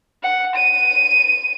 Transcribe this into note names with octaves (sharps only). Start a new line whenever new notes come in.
F#5
D#7